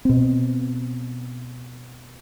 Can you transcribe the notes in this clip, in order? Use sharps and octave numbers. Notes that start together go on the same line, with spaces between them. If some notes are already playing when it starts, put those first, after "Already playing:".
B2 C4